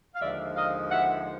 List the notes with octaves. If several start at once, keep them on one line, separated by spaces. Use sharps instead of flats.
F5
D#2 D3 F3 G#3 D5 E5
D#5 F5
E5 F#5